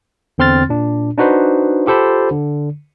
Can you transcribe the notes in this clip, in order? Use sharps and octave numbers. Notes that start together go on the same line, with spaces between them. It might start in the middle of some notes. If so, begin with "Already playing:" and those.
E2 D3 C4 C6 F6 A6
A#2 D4
D4 D#4 F#4 B4 C5
F4 G4 A4 C5 B5
D3